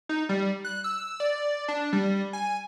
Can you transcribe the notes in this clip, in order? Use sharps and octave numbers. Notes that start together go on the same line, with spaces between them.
D#4
G3
F#6
E6
D5
D4
G3
G#5